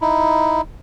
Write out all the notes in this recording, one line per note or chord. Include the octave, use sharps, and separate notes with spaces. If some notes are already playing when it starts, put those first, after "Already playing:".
D#4 E4